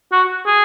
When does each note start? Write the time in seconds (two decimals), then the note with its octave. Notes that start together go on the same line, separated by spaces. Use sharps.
0.12 F#4
0.46 G#4